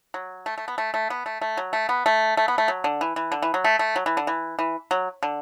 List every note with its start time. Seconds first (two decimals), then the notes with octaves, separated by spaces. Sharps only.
0.14 F#3
0.46 A3
0.58 A3
0.68 B3
0.78 A3
0.94 A3
1.10 B3
1.26 A3
1.41 A3
1.57 F#3
1.73 A3
1.89 B3
2.06 A3
2.37 A3
2.48 B3
2.58 A3
2.68 F#3
2.84 D3
3.01 E3
3.16 E3
3.32 D3
3.42 E3
3.54 F#3
3.65 A3
3.79 A3
3.96 F#3
4.06 E3
4.17 D3
4.27 E3
4.59 E3
4.91 F#3
5.23 D3